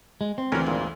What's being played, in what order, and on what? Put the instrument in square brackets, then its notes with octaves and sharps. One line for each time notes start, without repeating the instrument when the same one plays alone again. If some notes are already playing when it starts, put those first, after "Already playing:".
[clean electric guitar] G#3
C4
[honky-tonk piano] D2 E3 [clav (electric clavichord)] C#4 A#4 F#5
[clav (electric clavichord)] G#1 A#2